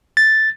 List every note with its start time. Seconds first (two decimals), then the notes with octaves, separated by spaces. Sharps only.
0.17 A6